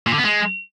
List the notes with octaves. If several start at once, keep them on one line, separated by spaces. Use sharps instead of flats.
A#2
D3
B3
G#3